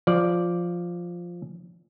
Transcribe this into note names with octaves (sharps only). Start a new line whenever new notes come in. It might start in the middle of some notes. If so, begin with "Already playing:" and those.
F3 D5